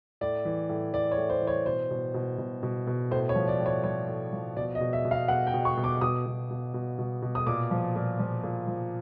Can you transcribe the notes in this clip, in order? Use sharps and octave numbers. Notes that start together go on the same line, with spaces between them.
A2 D5
E3
A2
E3 D5
C#5
A2
C5
E3
C#5
B2 C5
B2
B2
B2
B2
B2
A2 C5
C#5
F3
D5
A2
C#5
F3 C#5
A2
F3
B2 D5
D#5
B2
E5
B2
F5
B2 F#5
G5
B2
C#6
B2
D6
B2 D#6
B2
B2
B2
B2
B2
D#6
A#2 D6
F3
A#2
F3
A#2
F3